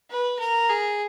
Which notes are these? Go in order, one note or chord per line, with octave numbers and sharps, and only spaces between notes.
B4
A#4
G#4